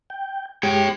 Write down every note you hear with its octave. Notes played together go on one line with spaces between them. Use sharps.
G5
G#3 G4 C#5 G5